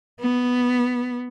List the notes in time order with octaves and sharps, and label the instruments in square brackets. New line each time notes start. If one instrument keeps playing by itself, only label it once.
[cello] B3